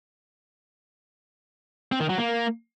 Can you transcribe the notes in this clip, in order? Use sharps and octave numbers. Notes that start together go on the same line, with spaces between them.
C4
D#3
F#3
A#3